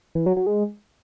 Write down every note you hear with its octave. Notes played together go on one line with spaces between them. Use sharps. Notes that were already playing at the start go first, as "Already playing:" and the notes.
E3
F#3
F#3
G#3